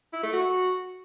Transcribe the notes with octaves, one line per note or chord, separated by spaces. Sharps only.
E4
A3
F#4